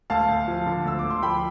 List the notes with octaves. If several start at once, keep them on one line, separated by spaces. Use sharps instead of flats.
D2 F5 A5
D2
F3
D3
D2 E6
D2 D6
C6
F3 G5 B5